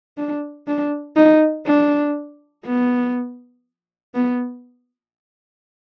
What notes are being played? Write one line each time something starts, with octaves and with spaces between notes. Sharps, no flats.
D4
D4
D#4
D4
B3
B3